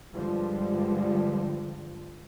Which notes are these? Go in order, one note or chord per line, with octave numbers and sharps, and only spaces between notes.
G2 D3 F3 G3 G#3